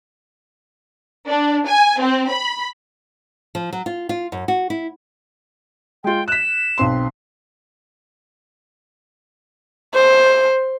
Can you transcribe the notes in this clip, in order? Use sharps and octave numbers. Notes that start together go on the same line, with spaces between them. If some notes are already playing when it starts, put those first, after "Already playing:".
D4
G#5
C4
B5
F3
F#3
F4
F4
F#2
F#4
E4
G#3 F4 G5
F#6 B6 E7
B1 C4 C6
C5